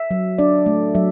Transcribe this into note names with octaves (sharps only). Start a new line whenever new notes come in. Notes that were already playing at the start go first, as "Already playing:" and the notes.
Already playing: E5
F#3
D4 D5
A3
F#3 E5